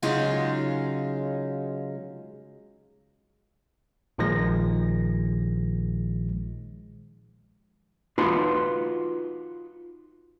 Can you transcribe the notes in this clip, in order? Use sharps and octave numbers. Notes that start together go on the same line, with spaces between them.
C#3 F#3 G#3 C#4 D#4 F4
A#1 A#2 D#3 F3 G#3 A#6
D#4 F4 F#4 B4 A5 C6